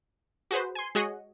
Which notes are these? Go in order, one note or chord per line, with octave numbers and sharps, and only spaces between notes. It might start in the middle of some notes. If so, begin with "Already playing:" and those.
F#4 G#4 B4 C5
G#5 C6
G#3 F#4 G#4 C#5 D#5 F#5